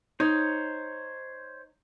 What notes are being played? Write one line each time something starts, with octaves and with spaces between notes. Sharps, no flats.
D#4 C5 C#5